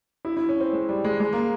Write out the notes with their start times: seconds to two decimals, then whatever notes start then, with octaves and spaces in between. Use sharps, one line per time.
0.25 E4
0.37 E4
0.49 C#4
0.60 C4
0.73 G#3
0.89 G3
1.04 G#3
1.20 G#3
1.33 A#3